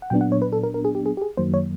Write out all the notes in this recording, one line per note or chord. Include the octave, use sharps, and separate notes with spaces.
F#5
A#2 F#3 B3 D4 G5
F#5
C#5
B4
A4
A#4
A#4
G#4
G4
G#4
G4
G#4
F#2 D#3 F#3 A#3 C5
C#5